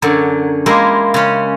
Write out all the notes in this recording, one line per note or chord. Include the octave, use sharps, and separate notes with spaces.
F#2 D3 F#3
G#3 A#3 E4 F4 G4
C#3 C#4